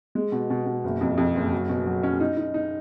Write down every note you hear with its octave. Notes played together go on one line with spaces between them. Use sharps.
G#3
B2
B2
B2
F#1
F2
F2
F#1
F#3
B2
F#3
C#4
D#4
D#4
D#4